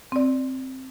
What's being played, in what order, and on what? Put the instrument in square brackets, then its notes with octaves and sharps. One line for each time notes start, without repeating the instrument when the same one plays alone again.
[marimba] C4 D5